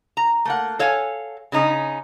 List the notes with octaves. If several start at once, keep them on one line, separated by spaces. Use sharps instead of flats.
A#5
A3 A#3 F#5
A4 C#5 F5 F#5 G#5
C#3 C#4 D#4